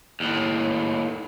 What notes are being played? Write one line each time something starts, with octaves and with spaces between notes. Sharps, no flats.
D#2 A2